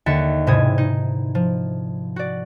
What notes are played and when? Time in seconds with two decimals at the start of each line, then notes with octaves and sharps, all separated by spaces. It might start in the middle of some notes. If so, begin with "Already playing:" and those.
0.06 D#2 D3 E5 A6 C#7
0.47 E1 G#2 C3 E4 D#6 G#6
0.78 D#4
1.35 F3
2.16 F#4 D5